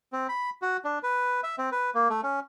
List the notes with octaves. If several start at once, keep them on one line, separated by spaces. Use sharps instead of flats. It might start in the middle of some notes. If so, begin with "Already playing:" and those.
C4
B5
F#4
D4
B4
E5
C4
B4
A#3
A3
C#4